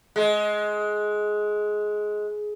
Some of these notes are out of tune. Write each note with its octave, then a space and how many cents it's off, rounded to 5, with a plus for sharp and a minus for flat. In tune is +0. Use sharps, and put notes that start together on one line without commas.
G#3 +15